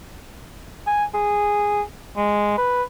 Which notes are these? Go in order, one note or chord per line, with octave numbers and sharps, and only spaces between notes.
G#5
G#4
G#3
B4